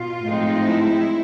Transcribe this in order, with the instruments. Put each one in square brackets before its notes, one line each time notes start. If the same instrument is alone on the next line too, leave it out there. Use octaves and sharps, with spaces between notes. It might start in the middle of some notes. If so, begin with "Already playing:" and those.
Already playing: [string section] B2 [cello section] F4
[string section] A2 F3 G#3 C4 D#4
[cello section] E4